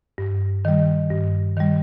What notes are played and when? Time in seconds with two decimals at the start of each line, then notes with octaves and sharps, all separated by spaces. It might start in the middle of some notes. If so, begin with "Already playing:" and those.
0.18 G2
0.65 D#3 G3
1.11 G2
1.57 D#3 G3